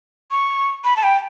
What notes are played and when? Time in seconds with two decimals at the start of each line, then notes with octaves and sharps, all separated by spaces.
0.31 C#6
0.84 B5
0.97 A5
1.03 G5